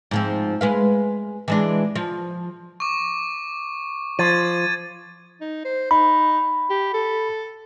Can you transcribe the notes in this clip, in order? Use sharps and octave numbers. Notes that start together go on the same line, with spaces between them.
G#2 F3 C4
G#3 B4 F5
E3 G#3 D4
F3
C#6 D6
F3 G#6 A6 D#7
D#4
C5
D#4 B5
G4
A4